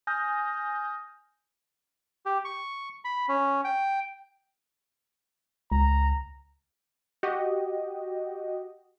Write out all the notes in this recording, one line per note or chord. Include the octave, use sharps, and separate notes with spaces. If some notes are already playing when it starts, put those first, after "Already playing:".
G#5 D#6 F6 G6 A#6
G4
C#6
B5
C#4
G5
C#2 A#5
F#4 G4 D#5